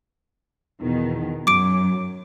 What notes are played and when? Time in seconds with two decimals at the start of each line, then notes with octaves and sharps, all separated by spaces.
0.81 E2 B2 D#3
1.47 F#2 F#3 D6 D7